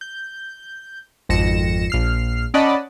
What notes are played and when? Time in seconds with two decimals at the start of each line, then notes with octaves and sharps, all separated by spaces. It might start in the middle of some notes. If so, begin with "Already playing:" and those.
0.01 G6
1.29 G#1 F2 A#6 C#7 E7
1.90 A#1 F6 C7
2.54 C#4 D5 D#5 F#5 A5 B5